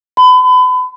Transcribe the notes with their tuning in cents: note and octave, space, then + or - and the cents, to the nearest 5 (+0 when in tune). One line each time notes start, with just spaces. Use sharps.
B5 +35